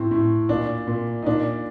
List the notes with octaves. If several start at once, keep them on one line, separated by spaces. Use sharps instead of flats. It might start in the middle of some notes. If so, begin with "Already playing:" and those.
Already playing: A2 C4
A2
A#2 D4
A#2
D#4
A#2 D4